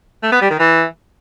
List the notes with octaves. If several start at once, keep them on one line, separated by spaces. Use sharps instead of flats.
A3
B3
G3
D#3
E3